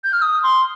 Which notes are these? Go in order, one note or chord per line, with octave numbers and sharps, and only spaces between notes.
G6
F6
D#6
C6